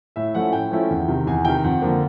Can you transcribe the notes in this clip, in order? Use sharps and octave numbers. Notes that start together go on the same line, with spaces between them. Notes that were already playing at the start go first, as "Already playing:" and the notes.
A2 E5
F3 A3 C#4 E4 F#5
A2 G5
F3 A3 C#4 E4
E2
C3 D#3
E2 G#5
C3 D#3 G5
F2 F#5
D3 F3 A#3